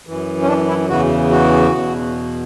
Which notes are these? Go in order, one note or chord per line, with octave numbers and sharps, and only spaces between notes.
F#2 E3
C#4
D4
E4
E2 C#3 E3 F#4
F#4
E2 B2